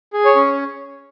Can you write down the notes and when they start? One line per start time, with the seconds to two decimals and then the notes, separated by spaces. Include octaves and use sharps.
0.13 G#4
0.25 C#5
0.36 C#4